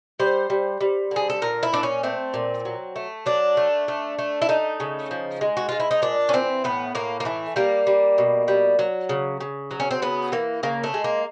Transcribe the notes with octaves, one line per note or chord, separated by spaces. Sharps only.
G3 C5
G3
G3
D3 G#4
A4
A#2 A#4
E4
A#2 D4
C#4
A3 C4
A#2
F#3
A3
F#3 D4
A3
A3
A3
E4
A3 D#4
C#3
F3
G#3
F#4
G#3 F4
E4
D#4
A#2 D4
C#4
E3 C4
A2 B3
A2 A#3
A#3
E3 A3
G3 A#3
G3
B2
G3
F#3
C#3
C#3
F#3
C#4
C4
C#3 B3
E3 A#3
C#3 A#3
A3
G#3
A#3